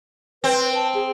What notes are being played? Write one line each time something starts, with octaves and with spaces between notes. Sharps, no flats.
C4 B4
A5
G#4